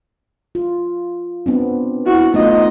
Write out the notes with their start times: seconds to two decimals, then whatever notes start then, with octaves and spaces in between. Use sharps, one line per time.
0.55 F4
1.46 B3 C4 D4
2.05 E4 F#4
2.34 A3 B3 D#4 F4 D#5